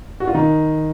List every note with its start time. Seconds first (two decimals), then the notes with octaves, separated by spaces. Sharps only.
0.20 F#4
0.27 F4
0.34 D#3 D#4